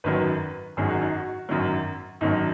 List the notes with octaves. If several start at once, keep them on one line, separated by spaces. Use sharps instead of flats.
G#1 F#2 D#3 F#3 B4
G#1 F#2 D#3 F#3 G#4
F#4
D#4
F#4
G#1 F#2 D#3 F#3
G#1 F#2 D#3 F#3 D#4